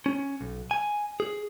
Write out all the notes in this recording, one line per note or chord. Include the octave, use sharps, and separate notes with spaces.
C#4
B1
G#5
G#4